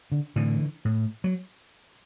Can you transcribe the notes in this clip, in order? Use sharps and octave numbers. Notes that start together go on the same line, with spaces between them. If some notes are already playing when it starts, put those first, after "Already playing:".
D3
A2 D3 E3
A2
F#3